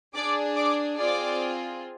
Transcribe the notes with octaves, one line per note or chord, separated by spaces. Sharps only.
D4 G#4 D5 D6
D5 D6
C4 F4 G#4 D5 D6